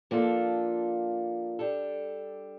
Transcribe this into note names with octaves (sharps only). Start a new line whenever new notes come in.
F3 A#3 D4 F4 A4
G3 D4 A4